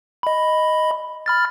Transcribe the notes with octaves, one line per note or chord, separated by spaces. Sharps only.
D#5 B5
B5 F6 A6